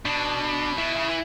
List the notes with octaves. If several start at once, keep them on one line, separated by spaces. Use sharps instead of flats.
B2 D4
B2 E4
C#3
E3